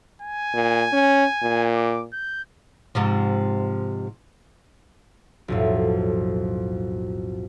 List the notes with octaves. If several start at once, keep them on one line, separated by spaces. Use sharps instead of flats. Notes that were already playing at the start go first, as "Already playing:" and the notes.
G#5
A#2
C#4
A#2
D6
G6
G#2 C3 F3
B1 F2 A2